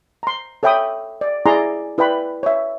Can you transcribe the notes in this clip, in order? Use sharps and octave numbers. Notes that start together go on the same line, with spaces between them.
A#5 C6
A4 C#5 E5 G5 B5 D#6
D5
E4 G#4 D5 G#5 A#5 C6
E4 B4 D5 G5 B5 C6
C#5 E5